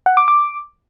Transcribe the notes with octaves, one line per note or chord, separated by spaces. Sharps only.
F#5
D6
D6